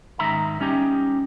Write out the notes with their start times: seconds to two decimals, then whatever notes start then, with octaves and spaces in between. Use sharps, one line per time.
0.19 G#2 D#3 E5 A#5
0.60 G3 C#4 D#4 G4